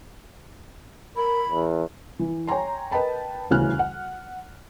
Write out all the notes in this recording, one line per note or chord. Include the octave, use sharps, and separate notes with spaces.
A#4 B5
E2
E3
C#5 G5 G#5 A#5 C6
A#4 B4 D#5 G5 A5 B5
D#1 D2 C#3 E3 F6 F#6
F#5